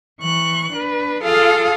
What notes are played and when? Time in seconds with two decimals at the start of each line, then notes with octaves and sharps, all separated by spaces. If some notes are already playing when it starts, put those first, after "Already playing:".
0.20 E3 C#6 F#6
0.73 D4 B4
1.24 F4 G#4 A4 F5 D#6